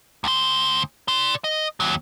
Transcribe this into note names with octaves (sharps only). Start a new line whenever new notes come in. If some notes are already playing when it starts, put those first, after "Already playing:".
D2 C5
D5 C6
D#5
D#2 F#3